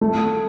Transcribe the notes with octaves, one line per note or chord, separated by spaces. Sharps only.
A3